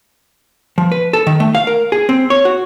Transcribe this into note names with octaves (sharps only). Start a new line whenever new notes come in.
F3
B4
A4
D#3
A3
F5
A#4
G#4
C4
C#5
F#4